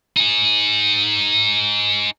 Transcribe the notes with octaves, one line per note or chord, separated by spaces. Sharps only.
D#4 G#4